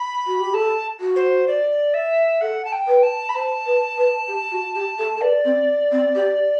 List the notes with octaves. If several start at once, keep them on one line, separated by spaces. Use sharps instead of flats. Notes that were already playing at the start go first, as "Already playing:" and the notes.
Already playing: B5
F#4
G4
A4 A5
F#4
C5
D5
E5
A4 F#5
A5
G5
B4
A5
B5
C5 A5
B4
B4
G4
F#4
G4
A4
A4
B4 D5
C4
C4
G4